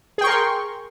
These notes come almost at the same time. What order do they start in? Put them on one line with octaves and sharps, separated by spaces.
G#4 G5 C#6 A#4 C6